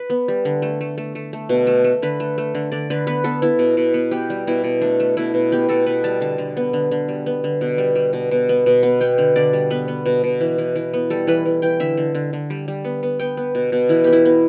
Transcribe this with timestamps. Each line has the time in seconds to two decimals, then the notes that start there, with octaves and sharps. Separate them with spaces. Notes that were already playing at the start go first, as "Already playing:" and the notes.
Already playing: B4
0.10 B3
0.28 G3
0.45 D3
0.62 A3
0.81 A3
0.98 A3
1.15 A3
1.33 A3
1.49 B2
1.67 A3
1.84 A3
2.02 D3 B4
2.20 A3
2.38 A3
2.55 D3
2.72 D3 D5
2.90 D3 B4
3.07 B3 B4
3.24 B3 A4
3.42 B3 E4
3.59 B2
3.77 B2
3.94 B3
4.11 B3 G4
4.30 G3
4.47 B2 E4
4.64 B2
4.81 A3 D4
5.00 A3
5.17 B2 E4
5.34 B2
5.52 B3 G4
5.69 B2 A4
5.86 B2 B4
6.04 G3 A5
6.21 D3 A5
6.38 D3
6.57 B3
6.73 D3
6.91 D3
7.08 G3
7.26 B3
7.44 D3
7.61 B2
7.78 G3
7.95 G3
8.13 B2
8.31 B2
8.49 B3
8.66 B2
8.83 B3
9.01 B3 G5
9.18 D3
9.36 D3 D5
9.53 G3
9.70 B3 B4
9.88 B3
10.06 B2
10.24 B2
10.41 E3
10.58 E3
10.76 E3
10.93 B3
11.10 G3 A4
11.27 E3 B4
11.46 E3
11.62 E3 G5
11.80 D3 E5
11.97 D3
12.15 D3
12.33 D3
12.50 G3
12.68 G3
12.85 B3
13.03 B3
13.19 B3 G5
13.37 B3
13.55 B2
13.72 B2
13.89 E3 E4
14.04 B3 G4
14.13 E4
14.25 B3